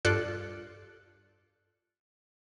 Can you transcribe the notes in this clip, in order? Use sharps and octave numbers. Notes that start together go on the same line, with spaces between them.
G2 F4 A4 D5 F#6 C#7